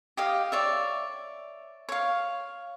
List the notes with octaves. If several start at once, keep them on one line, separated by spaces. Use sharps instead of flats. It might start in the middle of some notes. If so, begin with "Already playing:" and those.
G4 D#5 F5
C#5 D5 E5
C#5 F5